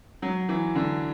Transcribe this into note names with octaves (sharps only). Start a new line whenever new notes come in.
F#3
E3
D3